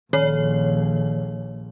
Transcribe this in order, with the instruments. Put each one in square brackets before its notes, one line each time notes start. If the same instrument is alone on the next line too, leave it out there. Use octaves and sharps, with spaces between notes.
[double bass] A#1 [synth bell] D#3 C#5